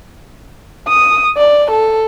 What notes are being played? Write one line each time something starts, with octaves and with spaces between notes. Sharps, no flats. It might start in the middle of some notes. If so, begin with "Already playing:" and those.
D#6
D5
A4